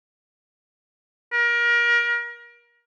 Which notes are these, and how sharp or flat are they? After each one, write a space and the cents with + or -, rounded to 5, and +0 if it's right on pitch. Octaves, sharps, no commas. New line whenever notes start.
A#4 +30